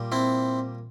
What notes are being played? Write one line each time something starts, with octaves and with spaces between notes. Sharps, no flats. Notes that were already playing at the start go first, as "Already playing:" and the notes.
Already playing: A#2 G3
C4 E4